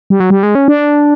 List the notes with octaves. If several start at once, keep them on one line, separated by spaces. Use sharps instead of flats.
G3
F#3
G3
G#3
C#4
D4